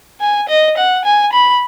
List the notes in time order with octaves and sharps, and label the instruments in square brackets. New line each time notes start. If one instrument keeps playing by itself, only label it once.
[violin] G#5
D#5
F#5
G#5
B5